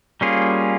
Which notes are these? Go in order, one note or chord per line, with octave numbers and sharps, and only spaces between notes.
G3 A#3 C#4 F4 G#4